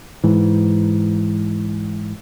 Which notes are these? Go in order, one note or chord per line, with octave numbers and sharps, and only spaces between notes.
G#2 E3